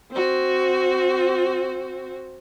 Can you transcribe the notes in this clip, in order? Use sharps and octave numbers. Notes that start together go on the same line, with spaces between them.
C4 F#4